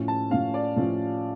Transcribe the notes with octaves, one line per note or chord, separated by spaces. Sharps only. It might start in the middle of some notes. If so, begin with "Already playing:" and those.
Already playing: A2 F3 C#4
A5
A2 F3 C#4 F5
D5
A2 F3 C#4